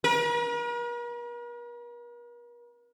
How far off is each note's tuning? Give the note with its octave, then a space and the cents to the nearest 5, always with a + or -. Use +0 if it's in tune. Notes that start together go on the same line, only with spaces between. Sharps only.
A#4 +45